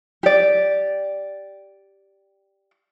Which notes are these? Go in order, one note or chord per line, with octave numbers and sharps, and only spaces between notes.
G4 D5